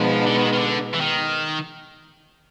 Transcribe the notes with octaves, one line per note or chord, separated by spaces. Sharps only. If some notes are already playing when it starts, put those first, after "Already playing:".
Already playing: B2 F3 G#3 B3 D#4
D3
D#3
D#3
D3
E3
D#3